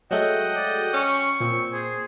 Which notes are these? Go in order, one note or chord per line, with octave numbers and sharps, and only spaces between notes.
F#3 G#3 A3 D#5 F#5 G5
D5
C#4 C#6
A#2 C4
G#4 C5